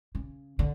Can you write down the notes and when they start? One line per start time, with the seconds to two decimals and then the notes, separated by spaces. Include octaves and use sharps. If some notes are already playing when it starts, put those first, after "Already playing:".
0.15 C#3
0.59 D3